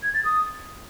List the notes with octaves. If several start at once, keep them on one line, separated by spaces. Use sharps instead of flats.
G#6
A6
D#6